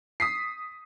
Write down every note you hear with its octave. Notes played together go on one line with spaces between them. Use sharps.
D#6 B6 C7